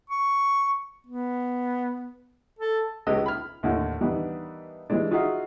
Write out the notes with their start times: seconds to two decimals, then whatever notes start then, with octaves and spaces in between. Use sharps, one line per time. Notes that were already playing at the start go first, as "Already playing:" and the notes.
0.10 C#6
1.07 B3
2.59 A4
3.07 C#2 G4 G#4 B4 D#5 E6
3.26 B5 F6
3.63 D#2 A2 D3
4.01 D#3 E3 G3 B3 D4 E4
4.90 E3 G3 G#3 D4
5.11 D#4 F4 F#4 G#4 E5 F5